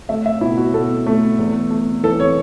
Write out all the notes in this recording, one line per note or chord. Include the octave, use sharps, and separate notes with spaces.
A3 E5
E5
B2 E4
F#4
B2 A4
A3
E2
A3
E3 A4
C#5